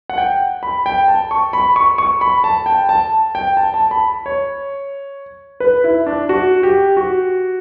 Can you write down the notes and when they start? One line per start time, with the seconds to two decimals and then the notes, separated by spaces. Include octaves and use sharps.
0.10 F#5
0.18 G5
0.63 B5
0.86 G5
1.08 A5
1.31 C#6
1.53 B5
1.76 C#6
1.98 C#6
2.21 B5
2.44 A5
2.66 G5
2.89 A5
3.35 G5
3.57 A5
3.74 A5
3.91 B5
4.26 C#5
5.60 B4
5.84 E4
6.06 D4
6.29 F#4
6.63 G4
6.97 F#4